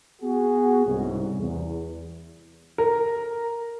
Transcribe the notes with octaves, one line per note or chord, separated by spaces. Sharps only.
B3 F#4 G#4
C2 G#2 C#3
E2
A#4